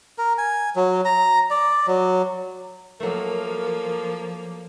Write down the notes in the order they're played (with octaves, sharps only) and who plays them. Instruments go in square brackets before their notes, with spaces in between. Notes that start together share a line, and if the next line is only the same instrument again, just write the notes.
[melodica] A#4
G#5
F#3
A#5
D5
F#3
[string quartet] F3 A#3 [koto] F#3 A3 [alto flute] A#4